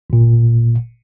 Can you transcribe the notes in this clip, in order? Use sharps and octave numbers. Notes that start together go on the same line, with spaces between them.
G1 A#2